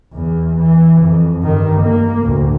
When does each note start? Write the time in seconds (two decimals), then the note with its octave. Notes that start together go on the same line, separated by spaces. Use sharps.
0.13 E2
0.59 E3
1.01 F2
1.44 G2 D#3
1.81 A#3
2.21 D2 A2